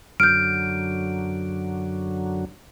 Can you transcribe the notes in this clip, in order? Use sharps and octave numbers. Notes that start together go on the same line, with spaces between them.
F#2 D3 F#3 F6 G6 D7